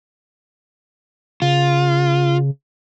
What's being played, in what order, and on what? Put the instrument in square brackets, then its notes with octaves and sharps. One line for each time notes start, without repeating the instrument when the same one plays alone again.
[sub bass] C#3 [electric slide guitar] F4